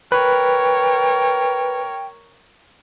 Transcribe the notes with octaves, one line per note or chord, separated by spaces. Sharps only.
A#4 B4 C#5 G5